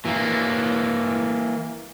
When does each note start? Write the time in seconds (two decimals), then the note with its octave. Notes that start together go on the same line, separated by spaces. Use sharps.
0.05 E3 A#3